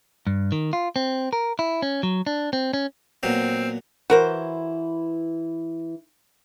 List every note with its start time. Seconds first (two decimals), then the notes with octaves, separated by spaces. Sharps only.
0.27 G2
0.52 D#3
0.73 F4
0.96 C4
1.33 A#4
1.59 E4
1.82 C#4
2.03 F#3
2.27 D4
2.53 C4
2.73 C#4
3.23 A#2 F#3 B3 C4
4.10 E3 E4 F#4 A#4 C5